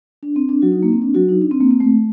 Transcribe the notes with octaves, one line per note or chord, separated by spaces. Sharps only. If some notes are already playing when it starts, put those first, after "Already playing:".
D4
C4
D4
F#3 F#4
D#4
A#3
C4
D4
F#3 F#4
D#4
D4
C4
A#3
C4
A3